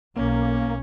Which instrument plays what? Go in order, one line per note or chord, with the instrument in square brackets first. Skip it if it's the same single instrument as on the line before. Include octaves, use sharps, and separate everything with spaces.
[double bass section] B1 [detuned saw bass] A#3 [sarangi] C#4